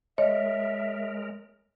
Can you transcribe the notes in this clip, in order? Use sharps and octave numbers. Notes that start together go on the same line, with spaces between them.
G#3 A#4 C#5 D#5 E5